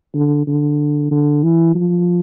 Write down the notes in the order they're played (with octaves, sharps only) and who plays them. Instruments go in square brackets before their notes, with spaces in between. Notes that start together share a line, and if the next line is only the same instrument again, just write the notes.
[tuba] D3
D3
D3
E3
F3